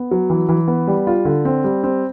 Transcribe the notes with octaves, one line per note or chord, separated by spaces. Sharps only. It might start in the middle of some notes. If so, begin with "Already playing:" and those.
Already playing: B3
F#3
E3
E3
B3
G3
F4
D3
C4
G3
C4